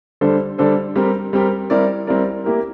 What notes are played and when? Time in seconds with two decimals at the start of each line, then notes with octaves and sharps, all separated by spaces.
0.21 D3 G3 D4 A4 C5
0.58 D3 G3 D4 A4 C5
0.96 G3 C4 G4 A#4
1.33 G3 C4 G4 A#4
1.70 G3 C4 E4 A#4 D5
2.07 G3 C4 E4 A#4 D5
2.44 A#3 E4 G4 A#4